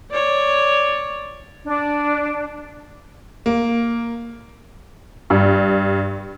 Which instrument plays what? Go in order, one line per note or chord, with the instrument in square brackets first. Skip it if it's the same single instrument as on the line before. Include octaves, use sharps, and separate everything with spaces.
[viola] C#5 D5
[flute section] D4
[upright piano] A#3
[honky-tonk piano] G2